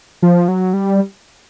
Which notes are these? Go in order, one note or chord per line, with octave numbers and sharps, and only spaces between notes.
F3
F#3
G3